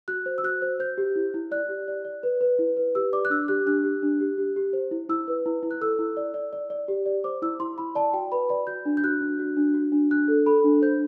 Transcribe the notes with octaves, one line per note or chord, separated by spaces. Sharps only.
F#4 F#6
C5
E6
F#4 F#6
C5
C5 G6
G4
E4
E4
D5 F#6
G4
D5
D5
B4
B4
E4
B4
G4 E6
D5 D6
F#6
D4 E6
G4 F#6
D4 F#6
G4
D4
G4
G4
G4
C5
E4
E4 E6
B4
E4
E4
F#6
A4 E6
E4
D5
D5
D5
D5
G4
D5
C5 D6
E4 E6
E4 C6
E4 B5
D5 A5
F#4 G5
B4 B5
D5 B5
F#4 G6
D4
G6
F#4 F#6
D4
F#4
D4
F#4
D4
D4 F#6
A4
A4 B5
D4
C5 G6